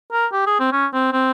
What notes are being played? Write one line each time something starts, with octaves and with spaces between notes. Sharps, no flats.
A#4
G4
G#4
C4
C#4
C4
C4